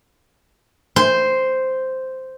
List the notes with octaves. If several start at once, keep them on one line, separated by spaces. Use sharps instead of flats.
C5